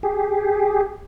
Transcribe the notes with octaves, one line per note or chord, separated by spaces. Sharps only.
G4 G#4